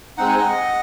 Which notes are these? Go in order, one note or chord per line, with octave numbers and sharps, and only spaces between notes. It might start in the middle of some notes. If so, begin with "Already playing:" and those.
G#3 C4 D#4 F#5
G#5
D#5 F#5